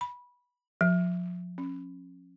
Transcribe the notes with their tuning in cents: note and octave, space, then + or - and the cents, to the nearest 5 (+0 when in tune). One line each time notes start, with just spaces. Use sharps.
B5 -15
F3 +35
C#4 -25